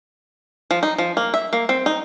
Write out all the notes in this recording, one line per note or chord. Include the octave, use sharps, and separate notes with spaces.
F3
D#4
F3
A#3
E5
A#3
C4
D#4